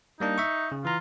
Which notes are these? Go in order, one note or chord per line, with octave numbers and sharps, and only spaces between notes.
G3 A#3 D4 D#4
E5 C#6
C#3
E3 F4 A#5